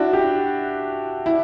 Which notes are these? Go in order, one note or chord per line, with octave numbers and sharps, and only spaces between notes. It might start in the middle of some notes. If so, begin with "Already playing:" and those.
Already playing: D4 E4 F#4
G4
E4